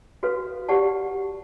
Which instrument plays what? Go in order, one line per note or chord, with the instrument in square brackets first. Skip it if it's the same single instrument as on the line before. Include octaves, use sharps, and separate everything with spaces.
[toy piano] F#4 A4 B4 F5
G4 D5 F#5 A5